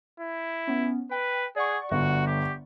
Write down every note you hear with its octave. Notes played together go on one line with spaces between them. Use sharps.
E4
B3 C#4
B4 G5
G#4 D5 F#5 C#6
G1 F#4
G4